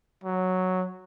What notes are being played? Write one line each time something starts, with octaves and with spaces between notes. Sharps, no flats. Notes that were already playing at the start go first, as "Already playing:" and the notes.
F#3